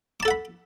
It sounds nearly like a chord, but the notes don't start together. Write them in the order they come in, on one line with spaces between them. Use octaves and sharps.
D6 A5 A4 F#5 B5